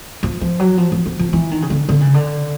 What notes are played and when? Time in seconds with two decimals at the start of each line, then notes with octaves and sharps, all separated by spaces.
0.23 F3
0.41 F3
0.60 F#3
0.77 F3
0.92 F3
1.06 F3
1.19 F3
1.33 E3
1.51 D#3
1.62 C#3
1.70 D3
1.89 D3
2.01 C#3
2.14 D3